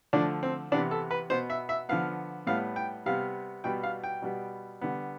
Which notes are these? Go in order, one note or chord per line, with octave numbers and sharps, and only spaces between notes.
D3 F3 A3 D4
C4
C3 E3 B3 D4
A4
B4
B2 B3 C5
E5
E5
D3 F3 B3 F5
A2 G3 B3 F5
G5
C3 G3 B3 F5
B2 G3 B3 G5
F5
G5
B2 G3 B3
D3 G3 B3